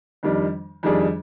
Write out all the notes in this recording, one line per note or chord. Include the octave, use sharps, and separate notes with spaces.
F2 D#3 G3 D4
F2 D#3 G3 D4 G#4